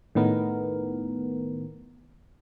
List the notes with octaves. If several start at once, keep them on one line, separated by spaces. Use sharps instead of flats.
A2 D#3 B3 A#4